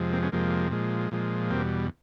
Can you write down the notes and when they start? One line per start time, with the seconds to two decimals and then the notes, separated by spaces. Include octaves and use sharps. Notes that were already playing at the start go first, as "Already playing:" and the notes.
Already playing: F2 C3 F3 G#3
0.12 A#3 C4
0.23 B3 C#4
0.32 F2 C3 F3 G#3 A#3
0.71 A#2 F3 G#3
1.11 A#2 F3 G#3
1.50 E2 B2 G3 A#3 C4